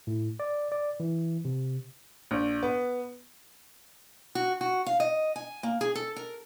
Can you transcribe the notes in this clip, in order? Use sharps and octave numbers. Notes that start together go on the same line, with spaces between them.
A2
D5
D5
E3
C3
A#1
B3
F#4
F#4
F5
D#5
G#5
A#3
G#4
A4
A#4